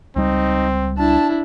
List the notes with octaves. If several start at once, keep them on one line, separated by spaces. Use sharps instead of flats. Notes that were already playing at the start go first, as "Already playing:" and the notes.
C#2 G3 C4 D#4
D4 E4 A5